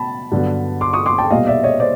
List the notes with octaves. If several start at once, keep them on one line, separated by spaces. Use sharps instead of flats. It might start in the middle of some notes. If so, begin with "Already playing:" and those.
Already playing: B2 A5 B5
G2 D3 F#3 B3
C6 D6
C#6 D#6
C6 D6
G5 A5
B1 A#2 G3 B3 D#5 F5
D5 E5
C#5 D#5
C5 D5